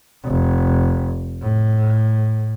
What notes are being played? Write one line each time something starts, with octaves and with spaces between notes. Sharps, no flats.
F1
A2